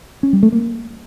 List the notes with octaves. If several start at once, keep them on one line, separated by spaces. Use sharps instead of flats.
C#4
G3
A3
A#3